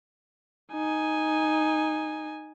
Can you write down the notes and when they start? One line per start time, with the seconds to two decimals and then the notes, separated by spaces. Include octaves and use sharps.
0.72 D#4 G#5